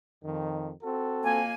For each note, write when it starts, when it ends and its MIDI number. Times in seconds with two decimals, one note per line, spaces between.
0.23 0.70 41
0.23 0.70 51
0.82 1.41 60
0.82 1.41 66
0.82 1.41 69
1.23 1.55 41
1.23 1.55 58
1.23 1.55 80